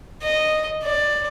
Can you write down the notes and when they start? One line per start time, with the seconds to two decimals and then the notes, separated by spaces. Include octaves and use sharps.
0.23 D#5
0.84 D5